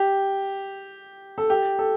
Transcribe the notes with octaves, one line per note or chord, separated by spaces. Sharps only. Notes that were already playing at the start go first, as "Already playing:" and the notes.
Already playing: G4
A4
G4
A4